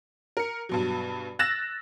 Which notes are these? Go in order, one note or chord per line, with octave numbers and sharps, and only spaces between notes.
A#4 C#7
G2 B2 F#3
E6 F#6 A6 A#6 E7